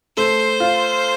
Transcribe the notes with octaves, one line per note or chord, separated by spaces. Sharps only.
A3 C5
F4